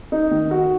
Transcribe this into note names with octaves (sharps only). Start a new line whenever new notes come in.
D#4
D#3
F#4